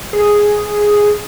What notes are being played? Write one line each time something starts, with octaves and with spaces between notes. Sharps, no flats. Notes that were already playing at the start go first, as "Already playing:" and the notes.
G#4